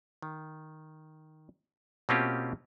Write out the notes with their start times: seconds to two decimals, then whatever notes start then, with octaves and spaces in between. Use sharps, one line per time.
0.22 D#3
2.09 B2 A#3 C4 C#4 F4 G4